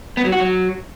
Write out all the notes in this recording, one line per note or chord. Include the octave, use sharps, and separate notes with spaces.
B3
F#3
F#4
F#3